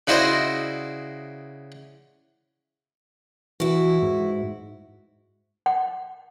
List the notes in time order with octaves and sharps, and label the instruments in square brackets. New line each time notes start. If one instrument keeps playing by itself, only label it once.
[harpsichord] C#3 E4 F#4 C5 D5 D#5
[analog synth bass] E3 [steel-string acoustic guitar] E4 F#4
[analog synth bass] G#2
[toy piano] F#5